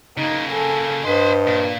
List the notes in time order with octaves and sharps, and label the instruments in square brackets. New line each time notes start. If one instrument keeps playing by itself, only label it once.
[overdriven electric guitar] C#3 A#3 [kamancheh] D#4
[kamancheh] A4 G#5
[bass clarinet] G2 [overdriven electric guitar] B4 C6 [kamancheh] C5 D#5
[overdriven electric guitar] A#2